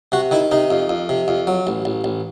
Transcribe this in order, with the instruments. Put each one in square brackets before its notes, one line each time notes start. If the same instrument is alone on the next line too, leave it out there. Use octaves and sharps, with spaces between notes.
[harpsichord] C3 F#4
D#3 E4
C3 D#4
F2
F2
C3
F2
F#3
A1
A1
A1